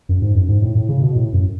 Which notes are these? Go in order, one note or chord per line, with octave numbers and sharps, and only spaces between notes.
F#2
G#2
F#2
G#2
A2
A2
C#3
B2
A2
F#2